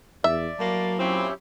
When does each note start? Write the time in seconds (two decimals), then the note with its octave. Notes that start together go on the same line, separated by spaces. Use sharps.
0.24 E2 D5 E5
0.60 A2 F#3 A#3
0.99 A#2 C4 C#4 E4 G4